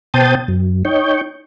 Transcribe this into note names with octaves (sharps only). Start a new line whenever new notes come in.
B2 C5 G5 A5 D#6
F#2
D#4 C#5 G5